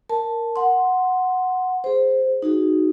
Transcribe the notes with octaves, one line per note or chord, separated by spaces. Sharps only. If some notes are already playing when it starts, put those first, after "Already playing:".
A#4 A5
F#5 C6
G#4 C5
D#4 F#4 G#4